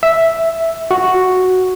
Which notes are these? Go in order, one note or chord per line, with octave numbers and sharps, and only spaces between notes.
E5
F#4